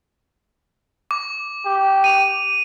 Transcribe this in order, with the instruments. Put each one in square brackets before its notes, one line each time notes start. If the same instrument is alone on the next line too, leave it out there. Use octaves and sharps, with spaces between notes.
[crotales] D6
[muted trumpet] G4
[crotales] D#7 F7